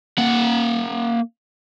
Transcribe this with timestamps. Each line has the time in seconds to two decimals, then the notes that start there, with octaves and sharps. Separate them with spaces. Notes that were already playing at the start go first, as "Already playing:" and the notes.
0.18 A#3 F#5